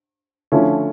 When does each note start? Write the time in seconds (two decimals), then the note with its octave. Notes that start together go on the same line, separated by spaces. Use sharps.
0.52 D3 F3 A3 C#4 E4